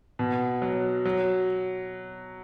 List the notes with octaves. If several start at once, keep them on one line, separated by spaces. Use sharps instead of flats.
B2
F#3
F#3